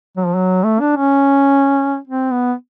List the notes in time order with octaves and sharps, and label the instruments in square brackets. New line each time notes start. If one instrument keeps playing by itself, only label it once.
[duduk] F#3
F3
F#3
A3
D4
C#4
C4
B3